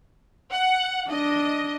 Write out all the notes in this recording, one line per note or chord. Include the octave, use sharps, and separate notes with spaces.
F#5
D4 D#5